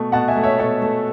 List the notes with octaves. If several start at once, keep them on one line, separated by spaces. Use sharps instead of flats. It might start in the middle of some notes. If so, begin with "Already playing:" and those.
Already playing: B2 A3
B2 F#5 A5
E5 G#5
A3
C#5 E5
B2 A4 C#5
A3